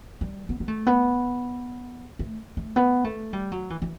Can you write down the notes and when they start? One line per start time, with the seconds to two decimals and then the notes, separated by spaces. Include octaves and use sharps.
0.21 G3
0.49 B3
0.60 B3
0.68 A3
0.87 B3
2.19 A3
2.57 A3
2.76 B3
3.04 A3
3.33 G3
3.52 F#3
3.70 E3
3.82 E3